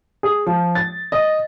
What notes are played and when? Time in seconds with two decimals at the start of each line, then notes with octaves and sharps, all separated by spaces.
0.23 G#4
0.46 F3
0.75 A6
1.12 D#5